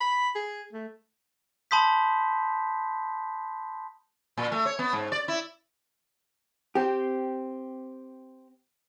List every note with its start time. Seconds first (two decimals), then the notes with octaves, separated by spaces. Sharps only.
0.01 B5
0.35 G#4
0.73 A3
1.71 A5 B5 C6 D#6 G6 B6
4.37 A#2
4.52 A3
4.65 C#5
4.79 B3
4.93 G#2
5.12 D5
5.28 E4
6.75 C4 G4